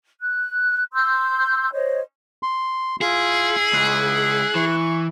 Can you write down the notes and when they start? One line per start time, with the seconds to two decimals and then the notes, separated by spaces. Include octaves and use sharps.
0.21 F#6
0.93 C6 E6 G6
1.73 C5 C#5 D#5
2.43 C6
3.01 E4 F4 G#4
3.74 C#2 F#6
4.56 E3 C#6